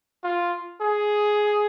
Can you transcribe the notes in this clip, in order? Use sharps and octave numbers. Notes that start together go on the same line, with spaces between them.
F4
G#4